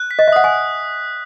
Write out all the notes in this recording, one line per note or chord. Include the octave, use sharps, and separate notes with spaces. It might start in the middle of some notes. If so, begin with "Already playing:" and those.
Already playing: F#6
B6
D#5
E5
F#5 D#6
G#5